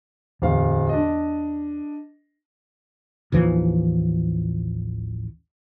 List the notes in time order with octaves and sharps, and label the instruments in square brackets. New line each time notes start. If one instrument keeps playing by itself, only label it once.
[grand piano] D1 F5 [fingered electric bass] E2
[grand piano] D4 D#5
[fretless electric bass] A1 D#2 E3 F3